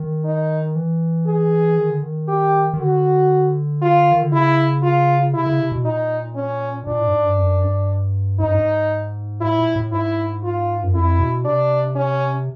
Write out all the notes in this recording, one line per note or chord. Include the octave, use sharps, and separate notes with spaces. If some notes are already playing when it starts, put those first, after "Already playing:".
Already playing: D#3
D#4
E3
G#4
D#3
D3
D#3
G4
D#3
D3 F#4
F4
D#3
D3
C#3 E4
F4
C3 E4
C#3
C3
B2
A#2 D#4
C#4
A#2 D4
A2
G2
G#2
G2
F#2
G2
G#2 D#4
G2
G#2
A2 E4
A#2
A2
G#2 E4
F4
F#2
F2 E4
B2
C3 D4
C#4